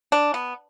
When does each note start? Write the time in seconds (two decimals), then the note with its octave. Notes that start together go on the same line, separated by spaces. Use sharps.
0.12 D4
0.34 B3